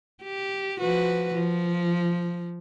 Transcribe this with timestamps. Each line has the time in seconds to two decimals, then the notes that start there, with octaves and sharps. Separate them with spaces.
0.24 G4
0.80 F3 F#4 B4
1.34 F3